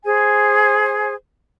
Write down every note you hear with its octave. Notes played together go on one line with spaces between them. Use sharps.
G#4 C5 G#5